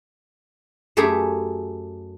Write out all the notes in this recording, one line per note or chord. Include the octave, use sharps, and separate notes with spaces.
F#2 A3 G4 G#4 A#5 B5